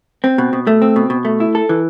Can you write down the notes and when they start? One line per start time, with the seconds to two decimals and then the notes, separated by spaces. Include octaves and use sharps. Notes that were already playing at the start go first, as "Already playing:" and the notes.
0.24 C4
0.38 B2
0.53 B2
0.67 A3
0.82 C4
0.96 B2
1.10 B2
1.25 A3
1.40 E4
1.55 A4
1.69 E3